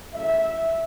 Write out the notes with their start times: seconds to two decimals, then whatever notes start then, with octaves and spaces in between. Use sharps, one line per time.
0.13 C#3 F#3 A3 E4 E5